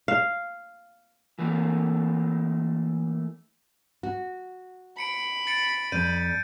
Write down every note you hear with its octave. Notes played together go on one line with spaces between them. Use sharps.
F5
E3 A3 A#3
F#4
B5 C#7 D7
A6 C#7 D7
F2 D5 G6 D#7